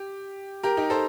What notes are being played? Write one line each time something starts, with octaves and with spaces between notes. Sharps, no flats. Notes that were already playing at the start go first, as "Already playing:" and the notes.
Already playing: G4
G4 A#4
D#4 G4
A4 C5